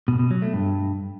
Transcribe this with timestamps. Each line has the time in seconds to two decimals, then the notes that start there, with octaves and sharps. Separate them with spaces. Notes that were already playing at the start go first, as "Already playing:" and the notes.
0.08 B2
0.19 B2
0.31 F#3
0.42 A3
0.53 G2